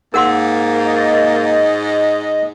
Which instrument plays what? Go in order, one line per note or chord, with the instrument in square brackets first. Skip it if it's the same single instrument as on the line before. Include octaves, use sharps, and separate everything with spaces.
[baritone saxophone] G#2 [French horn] A#3 [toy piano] A#4 F#5 C6
[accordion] D#5